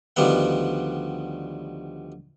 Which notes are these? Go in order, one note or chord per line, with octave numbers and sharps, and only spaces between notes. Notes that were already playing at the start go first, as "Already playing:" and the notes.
D2 D#3 F3 G3 B3 F#5